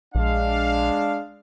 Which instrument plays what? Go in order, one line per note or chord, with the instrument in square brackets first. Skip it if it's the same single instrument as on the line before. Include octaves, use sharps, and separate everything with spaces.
[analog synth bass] A#1 [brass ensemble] G#3 D4 F5